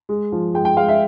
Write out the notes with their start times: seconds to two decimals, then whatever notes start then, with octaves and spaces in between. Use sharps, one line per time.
0.09 G#3
0.32 F3
0.54 G#3 G5
0.65 G5
0.76 G#3 F5
0.88 E5